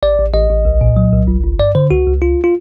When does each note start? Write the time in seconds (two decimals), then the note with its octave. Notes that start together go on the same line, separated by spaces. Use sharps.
0.03 A1 D5
0.18 A1
0.34 A1 D#5
0.50 A1
0.65 C2
0.81 A#2
0.96 F#3
1.13 C2
1.27 G1
1.44 G1
1.59 G2 D5
1.75 D3 C5
1.91 C#2 F#4
2.07 C#2
2.22 C#2 F4
2.44 F4